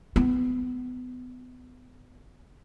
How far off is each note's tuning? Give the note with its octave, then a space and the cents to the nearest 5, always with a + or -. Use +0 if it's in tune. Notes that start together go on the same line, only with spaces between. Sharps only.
B3 +25